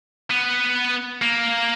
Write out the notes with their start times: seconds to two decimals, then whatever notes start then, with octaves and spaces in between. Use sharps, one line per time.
0.31 B3
1.22 A#3